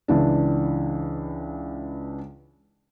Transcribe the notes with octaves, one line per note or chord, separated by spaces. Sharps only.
C#2 E3 D4